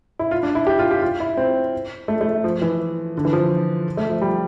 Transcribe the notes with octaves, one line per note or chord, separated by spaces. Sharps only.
E4
F4
D4
E4
G4
F4
G4
F4
E4
C4
A3
A3
F3
E3
D3
E3
F3
A3
F3
G3